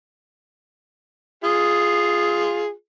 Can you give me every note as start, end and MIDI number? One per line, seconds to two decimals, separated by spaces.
1.44 2.71 65
1.44 2.71 68
1.44 2.45 87